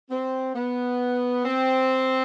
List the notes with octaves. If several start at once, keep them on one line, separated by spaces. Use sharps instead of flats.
C4
B3
C4